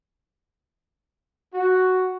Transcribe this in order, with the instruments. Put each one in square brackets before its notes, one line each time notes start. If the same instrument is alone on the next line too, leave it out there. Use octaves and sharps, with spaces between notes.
[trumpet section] F#4